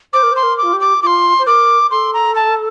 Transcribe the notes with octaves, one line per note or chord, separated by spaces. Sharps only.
C5 D6
A#4
C5
C6
A#4
D6
F4
G4
D6
F4 C6 D6
C5
A#4 D6
A4 C6
A#5
A5